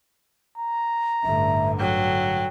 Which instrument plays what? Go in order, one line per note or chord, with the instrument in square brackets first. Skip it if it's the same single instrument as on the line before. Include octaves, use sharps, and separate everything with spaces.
[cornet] A#5
[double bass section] A1 G2 D3 [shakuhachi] E5
[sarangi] F#3 [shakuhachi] G5